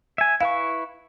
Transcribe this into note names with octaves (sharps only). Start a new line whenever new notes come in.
E5 G#5
E4 B4 F5 C#6